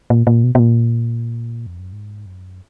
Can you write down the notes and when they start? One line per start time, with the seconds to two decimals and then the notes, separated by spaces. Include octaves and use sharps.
0.10 A#2
0.27 A#2
0.44 B2
0.55 B2
0.60 A#2
1.66 F2
1.80 F#2
1.93 G#2
2.26 F#2